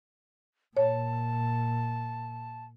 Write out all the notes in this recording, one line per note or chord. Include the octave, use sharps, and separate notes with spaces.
A#2 C#5 A5